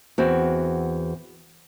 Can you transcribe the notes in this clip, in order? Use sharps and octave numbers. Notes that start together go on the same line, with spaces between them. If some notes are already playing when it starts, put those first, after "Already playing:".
E2 C4 F#4